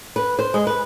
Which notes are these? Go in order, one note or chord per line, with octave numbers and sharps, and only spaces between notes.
B4
C5
G#3
B4